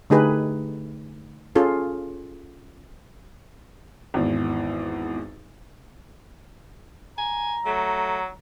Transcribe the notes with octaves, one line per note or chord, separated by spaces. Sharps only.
D3 A3 D#4 G4 G#4 B4
C#4 F4 G#4 A4
G#1 E2
G#5 A#5
F#3 A3